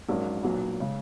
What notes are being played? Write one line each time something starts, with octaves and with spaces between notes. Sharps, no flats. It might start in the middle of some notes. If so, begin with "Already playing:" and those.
A#1 G#2 F#3 A#3 C#4
B1 A#2 F#3 B3
C#3 G#3